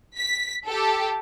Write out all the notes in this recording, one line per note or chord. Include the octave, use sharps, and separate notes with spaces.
B6
G4 A4